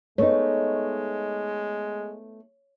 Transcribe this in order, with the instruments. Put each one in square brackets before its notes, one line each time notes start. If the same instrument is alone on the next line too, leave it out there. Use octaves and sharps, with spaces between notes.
[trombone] G#3 [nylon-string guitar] A3 B3 D#4 [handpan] C#5